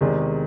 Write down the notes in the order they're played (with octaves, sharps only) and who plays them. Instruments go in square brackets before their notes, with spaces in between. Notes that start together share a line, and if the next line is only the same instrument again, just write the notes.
[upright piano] E2 C3 D#3 G#3